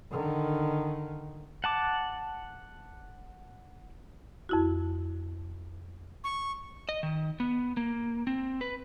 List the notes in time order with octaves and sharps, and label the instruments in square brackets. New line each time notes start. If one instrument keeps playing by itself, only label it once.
[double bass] D3 D#3
[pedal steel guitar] F#5 A5 D6
[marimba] F2 E4 F#4
[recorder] C#6
[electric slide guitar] D#5
D#3
B3
A#3
C4
B4